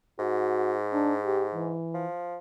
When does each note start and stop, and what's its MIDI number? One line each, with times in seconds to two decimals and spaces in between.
0.19 1.77 44
0.19 0.77 66
0.93 1.14 62
1.24 1.46 67
1.54 2.07 52
1.94 2.38 53